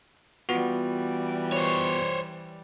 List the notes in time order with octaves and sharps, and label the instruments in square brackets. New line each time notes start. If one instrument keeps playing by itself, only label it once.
[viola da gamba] E3 G3 [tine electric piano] B3 F4 F#4
[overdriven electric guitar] C5 C#5